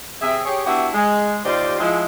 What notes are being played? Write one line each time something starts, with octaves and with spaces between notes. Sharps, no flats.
C3 C4 G#4 E5
G4 G#4 C#5
B3 D4 E4 F#4 G4 E5
G#3
D#2 F4 G4 C5 D5 D#5
F3 G#3 E4